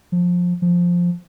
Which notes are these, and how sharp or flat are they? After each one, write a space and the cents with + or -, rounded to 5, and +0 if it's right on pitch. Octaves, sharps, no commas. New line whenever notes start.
F3 +20
F3 +5